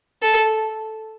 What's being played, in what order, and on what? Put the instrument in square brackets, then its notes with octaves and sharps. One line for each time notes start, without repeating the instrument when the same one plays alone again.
[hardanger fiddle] A4